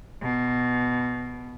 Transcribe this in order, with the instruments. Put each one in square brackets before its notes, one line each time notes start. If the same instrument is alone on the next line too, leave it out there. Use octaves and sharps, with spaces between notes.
[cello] B2